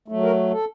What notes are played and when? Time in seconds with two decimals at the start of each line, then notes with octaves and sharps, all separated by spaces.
0.08 F#3 A3
0.23 A#4
0.52 A4